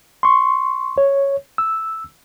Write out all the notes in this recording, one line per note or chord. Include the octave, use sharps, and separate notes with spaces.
C6 C#6
C#5
E6